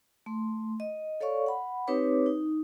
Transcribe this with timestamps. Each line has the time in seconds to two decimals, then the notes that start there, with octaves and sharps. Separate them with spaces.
0.26 A3 C6
0.80 D#5
1.21 A4 C#5 D5 F5 C#6
1.46 F#5 B5
1.87 C4 D#4 G4 B4 C#5 D6
2.26 D#4